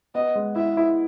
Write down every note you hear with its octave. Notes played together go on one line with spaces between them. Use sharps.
B3 D#5
G#3
E4 E5
E4